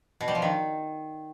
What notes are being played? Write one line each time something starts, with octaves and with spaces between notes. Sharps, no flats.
B2
G3
F3
D#3